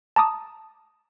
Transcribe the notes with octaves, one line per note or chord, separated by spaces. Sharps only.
A5 A#5 D6 D#6